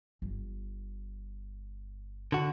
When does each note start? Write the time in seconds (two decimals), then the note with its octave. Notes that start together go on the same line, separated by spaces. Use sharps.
0.22 G1
2.32 D3 F#4